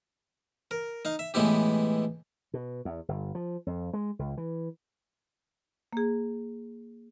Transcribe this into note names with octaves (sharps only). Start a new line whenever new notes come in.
A#4
D#4 F5
E5
A2 E3 G#3 B3 E4 G4
B2
E2
G1
F3
F2
G#3
C#2
E3
A#3 G#4